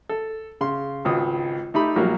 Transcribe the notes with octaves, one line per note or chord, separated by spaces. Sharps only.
A4
C#3 C6
G#1 C#2 D#6
A3 D#4 G4 B5
A#1 F#3 G3 A#3